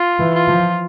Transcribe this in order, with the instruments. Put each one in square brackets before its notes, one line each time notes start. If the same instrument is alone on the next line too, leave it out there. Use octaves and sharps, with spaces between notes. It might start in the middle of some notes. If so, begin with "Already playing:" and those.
Already playing: [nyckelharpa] F4
[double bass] E3
[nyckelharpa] F4
[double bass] F3